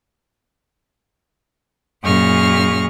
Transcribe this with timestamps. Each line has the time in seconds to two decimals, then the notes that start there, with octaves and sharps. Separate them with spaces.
2.03 F#2 A#2 G#4 C#6 F6 A#6